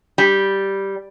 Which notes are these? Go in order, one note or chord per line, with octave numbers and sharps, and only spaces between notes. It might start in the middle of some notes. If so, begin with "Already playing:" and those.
G3